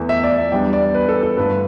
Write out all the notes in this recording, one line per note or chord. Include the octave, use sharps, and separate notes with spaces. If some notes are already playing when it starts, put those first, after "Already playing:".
Already playing: E2 E3 A3
E5
D5
E5
E2 E3 G3 D4 G5
D5
B4
A4
A4
G2 D3 A3 B4